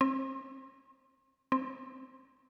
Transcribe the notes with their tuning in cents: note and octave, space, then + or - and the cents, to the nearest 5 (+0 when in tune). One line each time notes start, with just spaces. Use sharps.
C4 +30
C4 +0